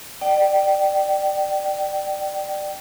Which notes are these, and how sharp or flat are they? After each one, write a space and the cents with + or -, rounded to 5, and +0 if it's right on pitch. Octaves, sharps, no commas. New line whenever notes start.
D5 +20 G5 -35